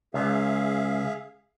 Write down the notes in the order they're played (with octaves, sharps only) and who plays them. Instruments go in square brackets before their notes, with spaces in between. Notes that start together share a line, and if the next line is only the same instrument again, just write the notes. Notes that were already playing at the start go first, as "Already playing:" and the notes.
[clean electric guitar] C#2 [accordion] G#4 E5 F5